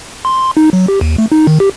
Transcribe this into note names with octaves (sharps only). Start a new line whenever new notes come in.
C6
D#4
F#3
G4
D#2
A3
D#4
D#3
G4